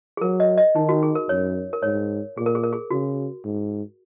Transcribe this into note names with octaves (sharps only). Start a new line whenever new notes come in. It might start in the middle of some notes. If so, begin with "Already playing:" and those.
G#4
F#3 A#4
D#5
D#5
D#3 D#4
F#4
G#4
A#4
F#2 C#5
A#4
G#2 C#5
A#2 G#4
A#4
G#4
A#4
G#4
C#3 F#4
G#2